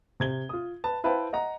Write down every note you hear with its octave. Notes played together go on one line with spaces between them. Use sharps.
C3 G#6 G7
F4 D#6
B4 A5
E4 B4 C5 F5 G5 A5
D#5 F#5 A#5